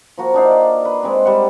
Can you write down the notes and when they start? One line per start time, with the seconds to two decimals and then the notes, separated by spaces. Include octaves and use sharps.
0.18 F3 A#3 F#4
0.34 D4 D#4 F5
0.51 D5
0.85 B4
1.03 G#3 C4
1.25 G3 F#5